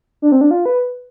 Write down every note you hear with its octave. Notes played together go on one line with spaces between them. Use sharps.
D4
C4
D4
F4
B4